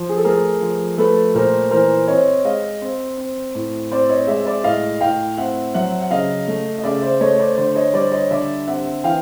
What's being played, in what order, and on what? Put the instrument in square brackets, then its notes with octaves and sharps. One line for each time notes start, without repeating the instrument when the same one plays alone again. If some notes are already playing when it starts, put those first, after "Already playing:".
Already playing: [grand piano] F3 C5
G#4
A4
A3 G#4 A#4
F3
A3 A4 B4
A#2 A#4 C5
E3 A#4 C5
C4 C#5 D#5
G#3 D#5 F5
C4
C4
A2
C4 C5 D5
C#5 D#5
G#3 D5 E5
D5 E5
A2 D#5 F5
A2 F5 G5
C4 E5 F#5
F#3 E5 F#5
F#5
C#3 D#5 F5
A3
D#5
C#3 D5 E5
C5 D5
A3 C#5 D#5
C5 D5
D3 C5 D5
C#5 D#5
G3 C5 D5
C#5 D#5
D3 D5 E5
C4 E5 F#5
E3 F5 G5